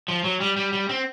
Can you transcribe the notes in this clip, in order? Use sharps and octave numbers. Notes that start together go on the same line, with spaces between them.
F3
F#3
G3
G3
G3
C4